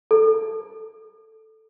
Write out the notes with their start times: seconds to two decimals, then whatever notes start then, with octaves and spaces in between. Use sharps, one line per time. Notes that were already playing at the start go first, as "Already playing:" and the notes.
0.11 A4